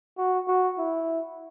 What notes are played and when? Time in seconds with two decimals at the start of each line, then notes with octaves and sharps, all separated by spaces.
0.18 F#4
0.47 F#4
0.78 E4